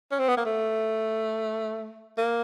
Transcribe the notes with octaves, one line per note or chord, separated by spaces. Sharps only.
C#4
C4
B3
A#3
A3
A#3